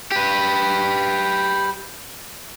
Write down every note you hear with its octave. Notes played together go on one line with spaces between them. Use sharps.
G4 B4